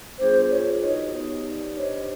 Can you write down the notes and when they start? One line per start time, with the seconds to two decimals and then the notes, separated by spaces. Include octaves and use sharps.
0.19 G3 B3 D4 F4 G#4 C5
0.50 F4 G#4 B4 C#5
0.82 D#4 F#4 A#4 C#5 D#5
1.13 B3 D#4 G4
1.45 D#4 G4 B4 D5
1.76 D4 G4 C5 C#5 D#5